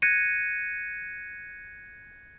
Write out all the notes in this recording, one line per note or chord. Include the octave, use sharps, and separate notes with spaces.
F#6 G#6 A#6 C#7 D#7